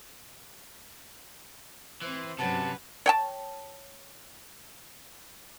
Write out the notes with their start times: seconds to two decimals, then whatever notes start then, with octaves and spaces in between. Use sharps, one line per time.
2.01 E3 C4 C5
2.39 G2 C3 F#3 C#4 F#4 B4 A5
3.06 C#5 G5 A5